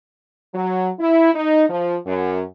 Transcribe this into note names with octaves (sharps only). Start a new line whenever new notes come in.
F#3
E4
D#4
F3
F#2